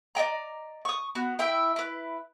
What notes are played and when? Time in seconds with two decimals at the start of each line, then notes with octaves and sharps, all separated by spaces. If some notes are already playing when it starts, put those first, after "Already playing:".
0.15 D5 D#5 G5 A#5
0.85 C#6 D#6
1.15 B3 F#4
1.39 E4 E5 G5
1.76 E4 B4